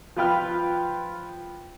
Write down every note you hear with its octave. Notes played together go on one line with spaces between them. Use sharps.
F3 F4 B4 G5 F6